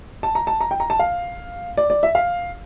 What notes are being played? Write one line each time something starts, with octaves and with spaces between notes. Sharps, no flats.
A5
A#5
A5
A#5
G5
A#5
A5
F5
D5
D5
E5
F5